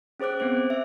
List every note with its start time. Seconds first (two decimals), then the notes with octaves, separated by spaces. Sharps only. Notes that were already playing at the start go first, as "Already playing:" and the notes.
0.20 C#4 G#4 C5 D6 F#6
0.40 B3 C4 C5
0.70 E5